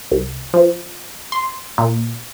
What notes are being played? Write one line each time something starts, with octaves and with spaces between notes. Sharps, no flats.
C2
F3
C6
A#2